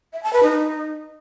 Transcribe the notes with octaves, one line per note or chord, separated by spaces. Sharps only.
E5
A5
B4
D#4